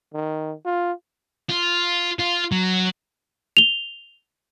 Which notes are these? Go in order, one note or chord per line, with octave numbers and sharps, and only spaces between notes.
D#3
F4
F4
F4
F#3
F7 G7